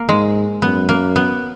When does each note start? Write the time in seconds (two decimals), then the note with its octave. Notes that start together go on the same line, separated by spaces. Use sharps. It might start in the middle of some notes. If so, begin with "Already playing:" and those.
Already playing: A#3
0.08 G#2 G#3
0.62 F#2 B3
0.89 A#3
1.16 B3